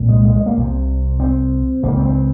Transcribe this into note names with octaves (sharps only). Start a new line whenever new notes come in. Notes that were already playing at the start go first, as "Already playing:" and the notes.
Already playing: C2 A#2
G#3
G#3
G#3
A#3
C2 C3
C4
C#2 C#3 A#3
C4
C4